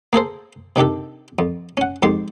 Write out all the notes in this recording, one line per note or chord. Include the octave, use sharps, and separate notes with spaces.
A#3 G#4 A4 C5
C3 D#3 D4 G4 A4
F2
C#4 F#5
F2 G#2 G4 C6